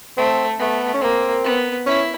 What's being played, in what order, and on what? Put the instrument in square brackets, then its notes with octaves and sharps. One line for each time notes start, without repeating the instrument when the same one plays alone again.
[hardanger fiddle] A3 [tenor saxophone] C4
[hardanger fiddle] A3 [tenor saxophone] B3
[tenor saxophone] C#4
[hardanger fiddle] A#3 [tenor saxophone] C4
[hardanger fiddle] B3
[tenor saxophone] C#4 [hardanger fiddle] E4